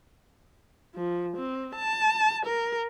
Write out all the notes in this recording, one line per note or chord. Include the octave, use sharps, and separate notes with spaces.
F3
C4
A5
A#4